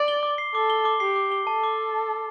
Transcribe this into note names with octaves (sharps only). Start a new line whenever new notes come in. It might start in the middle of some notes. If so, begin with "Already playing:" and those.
Already playing: D5
G7
D6
C7
A4 D6
G7
D6
G4 C7
D6
G7
A4 A5
D6